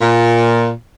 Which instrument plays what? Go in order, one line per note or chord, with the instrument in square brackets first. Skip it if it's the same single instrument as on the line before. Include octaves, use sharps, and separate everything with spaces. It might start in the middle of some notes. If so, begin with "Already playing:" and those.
[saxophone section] A#2